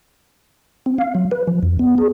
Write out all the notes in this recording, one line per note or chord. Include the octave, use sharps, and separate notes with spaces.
C4
F5
F#3
B4
F3
F2
B3
G#4